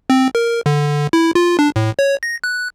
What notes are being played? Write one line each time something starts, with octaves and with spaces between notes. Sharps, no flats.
C4
A#4
D3
E4
F4
D4
A2
C#5
A#6
F#6